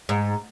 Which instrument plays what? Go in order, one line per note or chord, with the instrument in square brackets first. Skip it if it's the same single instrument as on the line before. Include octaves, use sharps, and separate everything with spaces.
[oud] G#2